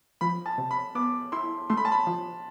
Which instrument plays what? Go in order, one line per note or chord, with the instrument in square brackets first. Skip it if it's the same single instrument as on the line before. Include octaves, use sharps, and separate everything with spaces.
[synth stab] F3 [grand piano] B5
[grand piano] A5
[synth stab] C3
[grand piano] B5
[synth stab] B3 [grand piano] D6
[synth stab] E4 [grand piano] C6
[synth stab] A3 [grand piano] C6
[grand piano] B5
A5
B5
[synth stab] F3